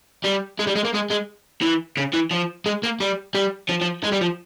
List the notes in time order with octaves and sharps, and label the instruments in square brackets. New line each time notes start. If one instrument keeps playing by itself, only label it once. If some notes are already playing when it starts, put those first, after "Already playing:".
[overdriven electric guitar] G3
G#3
G3
G#3
A#3
G#3
G#3
E3
C#3
E3
F3
G#3
A#3
G3
G3
F3
F3
G#3
G3
F3